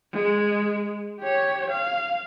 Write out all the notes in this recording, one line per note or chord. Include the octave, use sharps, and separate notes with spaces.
G#3
G4 C#5
F5